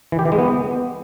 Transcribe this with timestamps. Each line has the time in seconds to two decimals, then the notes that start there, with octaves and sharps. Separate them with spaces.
0.12 E3
0.19 G4
0.25 E3
0.32 G#3
0.38 B3